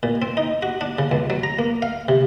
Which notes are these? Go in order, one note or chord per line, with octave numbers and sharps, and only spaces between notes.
A#2
C4
D#4
F#4
D4
C#3
C#2
F#3
A#5
A#3
F5
C3